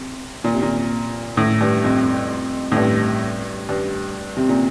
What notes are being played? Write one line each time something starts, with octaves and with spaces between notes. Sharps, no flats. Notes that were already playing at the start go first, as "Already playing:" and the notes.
Already playing: C3
A#2
C3
A#2
A2
G2
F2
A2
G2
G2
C3
A#2